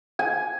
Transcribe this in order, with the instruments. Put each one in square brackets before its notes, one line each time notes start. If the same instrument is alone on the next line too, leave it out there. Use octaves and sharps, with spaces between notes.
[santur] G#5